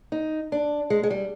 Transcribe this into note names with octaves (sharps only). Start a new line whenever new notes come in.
D#4
D4
G#3
G#3
G3